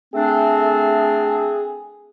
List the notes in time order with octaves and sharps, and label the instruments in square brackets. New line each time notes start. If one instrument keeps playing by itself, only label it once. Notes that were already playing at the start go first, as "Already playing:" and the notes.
[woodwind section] A3 C4 D4 [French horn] G#4